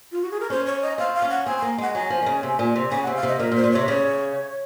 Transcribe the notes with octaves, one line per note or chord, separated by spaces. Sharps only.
F4
F#4
G#4
A#4
C#4 C5
C#5
D#5
C4 F5
F5
C#4
F#5
C4 G#5
G#5
A#3
G#3 F#5
F#3 G#5
F3
D#3
C#3
C3
A#2
C3
C#3 G#5
F#5
C3
F5
C3 D#5
A#2 A#4
A#2
C5
A#2
C3 C#5
C#3 C#5